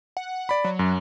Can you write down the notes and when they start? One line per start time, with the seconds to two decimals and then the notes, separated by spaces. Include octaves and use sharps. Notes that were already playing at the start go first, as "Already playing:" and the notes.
0.17 F#5
0.49 D5 B5
0.64 F#3
0.79 F#2